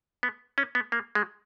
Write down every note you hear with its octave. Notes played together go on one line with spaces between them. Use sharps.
B3
C#4
B3
A#3
G#3